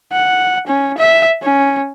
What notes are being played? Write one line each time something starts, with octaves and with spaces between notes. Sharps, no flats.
F#5
C#4
E5
C#4